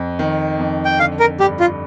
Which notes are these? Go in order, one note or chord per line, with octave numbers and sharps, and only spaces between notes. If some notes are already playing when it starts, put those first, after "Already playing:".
Already playing: F2
D#3
F2
G5
D3 F5
A#4
G2 G4
F4